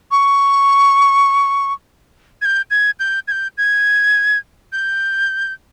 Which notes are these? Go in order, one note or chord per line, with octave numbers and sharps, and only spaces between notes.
C#6
G#6
G6
G#6
G6
G#6
G6
G#6
G6